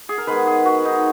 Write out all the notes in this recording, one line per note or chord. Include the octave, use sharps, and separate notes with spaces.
G#4
A#4
D#3 G#3 B3 B4
G#4
F#4
D#4